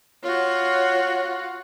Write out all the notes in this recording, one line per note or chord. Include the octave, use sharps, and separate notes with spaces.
F4 F#4 C#5